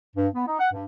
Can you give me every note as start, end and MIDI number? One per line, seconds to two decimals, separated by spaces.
0.16 0.28 43
0.35 0.46 59
0.47 0.56 63
0.60 0.69 78
0.72 0.85 43